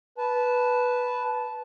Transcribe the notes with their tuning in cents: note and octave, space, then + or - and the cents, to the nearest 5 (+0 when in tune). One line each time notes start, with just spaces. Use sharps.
B4 +0 A5 -15